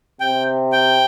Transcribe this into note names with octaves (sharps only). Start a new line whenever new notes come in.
C3 G5
G5